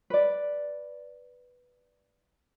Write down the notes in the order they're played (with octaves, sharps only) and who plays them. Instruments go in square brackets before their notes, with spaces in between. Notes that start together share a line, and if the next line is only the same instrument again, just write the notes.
[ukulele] B4 D5